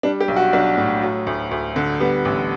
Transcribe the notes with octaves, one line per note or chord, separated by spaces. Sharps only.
G3 D4
G4
B1
F#4
B1 D4
A2
F#3
D2
D2
D3
G3 B3
A1